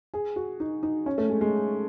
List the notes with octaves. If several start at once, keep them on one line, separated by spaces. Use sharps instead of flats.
G#4
F#4
D#4
D#4
C#4
A3
G#3
G#3